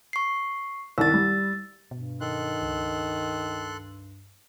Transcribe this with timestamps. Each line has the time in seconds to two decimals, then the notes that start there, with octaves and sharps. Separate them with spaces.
0.13 C#6 C7
0.98 C2 D#3 E6 A6
1.14 G3
1.91 G2 B2
2.21 D#3 A4 C6 F#6
2.62 C#2